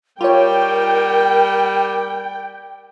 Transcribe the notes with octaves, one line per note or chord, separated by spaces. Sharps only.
G3 F4 A#4 C#5 G5